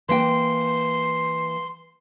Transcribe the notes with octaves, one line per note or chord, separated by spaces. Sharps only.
E3 A#3 G5 C6